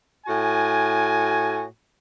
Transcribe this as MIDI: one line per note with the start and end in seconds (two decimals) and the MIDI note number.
0.26 1.63 45
0.26 1.63 66
0.26 1.63 80